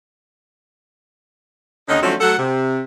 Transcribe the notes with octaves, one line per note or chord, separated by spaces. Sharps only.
D#2 D3 C#4 D#4
D3 F3 F#3 A3 C4 C#4
F#3 A3 A4 F#5
C3